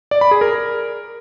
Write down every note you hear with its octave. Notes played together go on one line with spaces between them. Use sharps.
D5
B5
G#4
A#4